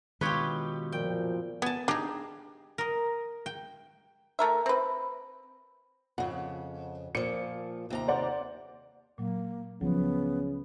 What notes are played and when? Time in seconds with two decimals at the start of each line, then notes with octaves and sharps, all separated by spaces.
0.21 B2 D#3 G#3 D4 F4 G4 B4 C#5
0.92 F#2 A#2 F3 G5
1.62 B3 G#5 A5
1.88 D4 D#4 G4 G#4
2.78 A#4 D#5
3.46 G5
4.39 A3 A#4 E5
4.66 C4 B4
6.18 F2 C#3 F#5
7.15 A#2 F3 C#7
7.90 D#2 C3 A#5
8.08 C5 D5 F#5
9.18 A#2 F#3 A#3
9.81 C#2 C#3 F3 F#3 B3